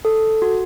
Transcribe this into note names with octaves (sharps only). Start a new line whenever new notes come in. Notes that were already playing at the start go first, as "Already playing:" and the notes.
A4
F#4